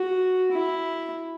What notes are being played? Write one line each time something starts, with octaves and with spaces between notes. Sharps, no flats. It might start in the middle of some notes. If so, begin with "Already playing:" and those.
Already playing: F#4
E4